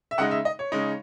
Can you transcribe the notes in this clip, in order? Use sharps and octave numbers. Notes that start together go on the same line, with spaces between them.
E5
C#3 G#3 D#4 F#5
E5
D#5
C#5
C#3 G#3 D#4